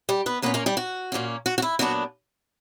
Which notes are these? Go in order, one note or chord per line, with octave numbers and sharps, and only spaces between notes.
G3 G4
B3 B4
A#2 A#3 B3 C#4 B4
A#3 A#4
G3 G4
F#4
A#2 A#3 C#4
F#4
F#4
E4
A#2 F#3 B3 D4 F#4